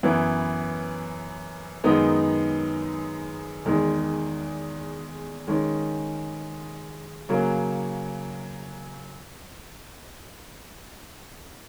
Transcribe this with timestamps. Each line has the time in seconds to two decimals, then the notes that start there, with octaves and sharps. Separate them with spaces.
0.03 F#2 E3 B3 E4
1.84 F#2 D#3 G#3 B3 D#4
3.65 E2 D#3 G#3
5.48 D#3 G#3 C#4
7.29 C#3 F#3 A#3 C#4